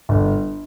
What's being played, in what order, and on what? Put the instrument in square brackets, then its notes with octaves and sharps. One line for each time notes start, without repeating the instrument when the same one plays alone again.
[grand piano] G1